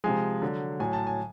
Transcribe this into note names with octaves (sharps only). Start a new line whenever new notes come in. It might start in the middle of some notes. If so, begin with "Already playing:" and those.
C3 F3 G#3 G#5
D3 F#3
A2 F#3 G#5
A5
G#5